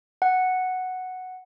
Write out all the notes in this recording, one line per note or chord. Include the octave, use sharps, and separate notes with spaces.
F#5